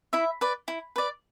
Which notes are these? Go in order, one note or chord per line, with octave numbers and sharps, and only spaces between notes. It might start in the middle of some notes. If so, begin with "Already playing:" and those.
E4 E5
B4 D5
E4
B4 D5